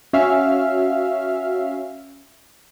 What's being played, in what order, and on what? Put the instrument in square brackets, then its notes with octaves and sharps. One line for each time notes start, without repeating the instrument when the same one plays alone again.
[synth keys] C#4 F#4 E5 F5 F6